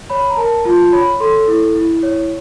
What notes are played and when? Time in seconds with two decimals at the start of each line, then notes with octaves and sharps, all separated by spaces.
0.10 C#5 B5
0.30 A#5
0.37 A#4 A5
0.65 F4 A5
0.92 C#5 B5
1.20 A4 C6
1.48 E4
1.75 E4
2.03 C#5